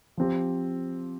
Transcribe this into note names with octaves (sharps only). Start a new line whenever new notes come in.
F3 C4 G4